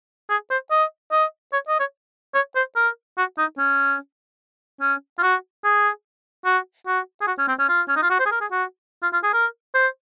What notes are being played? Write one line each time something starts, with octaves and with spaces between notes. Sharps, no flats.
G#4
C5
D#5
D#5
C#5
D#5
C#5
C#5
C5
A#4
F#4
D#4
C#4
C#4
F4
F#4
G#4
F#4
F#4
G#4
F#4
C#4
C4
C#4
F4
C#4
D#4
F4
F#4
C5
G#4
A#4
G#4
F#4
F4
F4
G#4
A#4
C5